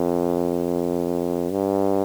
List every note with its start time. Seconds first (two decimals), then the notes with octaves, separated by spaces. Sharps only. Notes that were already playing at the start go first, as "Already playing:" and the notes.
Already playing: F2
1.51 G2